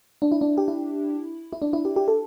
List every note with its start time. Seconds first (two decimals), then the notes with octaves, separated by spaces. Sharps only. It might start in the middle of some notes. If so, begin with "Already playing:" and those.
0.22 D4
0.32 E4
0.41 D4
0.58 G4
0.68 E4
1.53 E4
1.62 D4
1.73 E4
1.85 G4
1.96 G4
2.08 A4